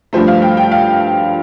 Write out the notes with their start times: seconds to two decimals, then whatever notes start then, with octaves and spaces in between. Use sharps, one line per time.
0.13 G2 F3 A3 C5
0.28 F5
0.42 G5
0.57 G5
0.71 F5